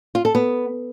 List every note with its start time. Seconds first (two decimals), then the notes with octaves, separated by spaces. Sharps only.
0.15 F4
0.25 A4
0.35 B3